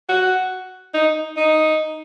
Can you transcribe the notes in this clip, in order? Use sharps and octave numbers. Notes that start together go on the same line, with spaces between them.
F#4
D#4
D#4